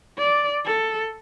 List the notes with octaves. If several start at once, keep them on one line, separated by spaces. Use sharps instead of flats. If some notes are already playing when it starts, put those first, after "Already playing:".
D5
A4